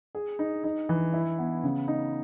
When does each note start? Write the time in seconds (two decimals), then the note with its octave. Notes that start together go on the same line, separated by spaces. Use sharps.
0.15 G#4
0.39 D#4
0.64 D#4
0.89 E3
1.14 E4
1.39 B3
1.63 C#3
1.88 D#4